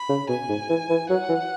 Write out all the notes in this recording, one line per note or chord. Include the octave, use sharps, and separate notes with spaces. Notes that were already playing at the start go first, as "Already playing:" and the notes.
Already playing: B5
C#3
B2 G#5
G#2
E3
E3
F#3 F#5
E3